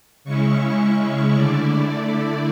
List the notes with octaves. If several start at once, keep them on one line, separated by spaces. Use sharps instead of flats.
C#3 G#3 C#4 E4 C#6
D3 A3 E4 D5